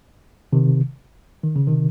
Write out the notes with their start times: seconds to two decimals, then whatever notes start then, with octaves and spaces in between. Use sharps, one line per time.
0.53 C3 D#3
1.43 D#3
1.56 C#3
1.67 C3 D#3